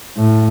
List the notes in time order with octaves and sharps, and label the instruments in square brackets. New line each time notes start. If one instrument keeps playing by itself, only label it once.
[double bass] A2